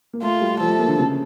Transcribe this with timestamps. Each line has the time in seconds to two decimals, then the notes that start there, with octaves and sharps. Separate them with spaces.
0.13 A#3
0.23 A3 F4
0.42 G3
0.60 F3 A4
0.70 A3
0.79 A#3
0.88 D3
0.98 C#3